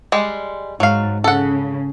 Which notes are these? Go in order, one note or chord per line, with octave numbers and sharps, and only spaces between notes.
G3 G#3
G#2 F#3 F5
C#3 A4 F#5